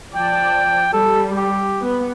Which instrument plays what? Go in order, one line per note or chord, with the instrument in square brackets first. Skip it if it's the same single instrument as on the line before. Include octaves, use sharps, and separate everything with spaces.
[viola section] F3 D5 A5 [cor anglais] G5
[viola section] G3 [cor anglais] A4
[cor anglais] G4
[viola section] B3